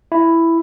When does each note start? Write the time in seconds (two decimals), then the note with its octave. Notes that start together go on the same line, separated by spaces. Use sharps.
0.12 E4